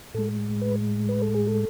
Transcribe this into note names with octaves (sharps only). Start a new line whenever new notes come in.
A2 G#3 A4
B4
B4
A4
G#4
A4